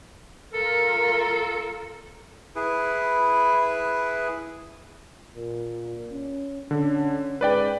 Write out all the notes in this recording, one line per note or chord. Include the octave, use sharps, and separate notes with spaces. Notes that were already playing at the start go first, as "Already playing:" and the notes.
F4 A4 A#4
E4 G#4 B4
A#2
C#4
D3 C#4
G#2 B4 D5 G5